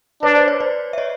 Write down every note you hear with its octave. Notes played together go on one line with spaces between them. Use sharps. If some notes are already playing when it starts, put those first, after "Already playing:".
D4 B4 C#5
C5 D5
B4 C#5
C5 D5
E5
C#5 D#5